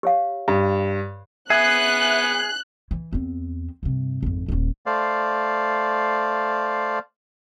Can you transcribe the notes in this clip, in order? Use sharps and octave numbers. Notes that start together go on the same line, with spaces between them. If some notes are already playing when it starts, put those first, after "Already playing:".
G4 C#5 F5
G2
B3 G#4 E5 F#6
E3
E2 C4
G2 C3
G#1 F2
D#1 G#1
A3 C5 D5 F5